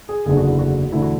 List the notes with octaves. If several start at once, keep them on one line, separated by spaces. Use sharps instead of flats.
G#4
F#1 E2 D3 G#4
F#4
E4
F#4
E1 D2 D3 A3 E4
F#4